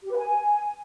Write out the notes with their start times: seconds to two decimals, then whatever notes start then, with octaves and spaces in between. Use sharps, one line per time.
0.04 G4
0.11 B4
0.17 G#5